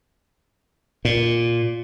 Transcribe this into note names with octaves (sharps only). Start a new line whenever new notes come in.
A#2